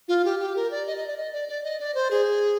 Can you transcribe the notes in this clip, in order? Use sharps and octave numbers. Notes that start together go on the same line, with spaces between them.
F4
G4
G4
A#4
D5
D#5
D#5
D5
D#5
D5
D5
D#5
D5
C5
G#4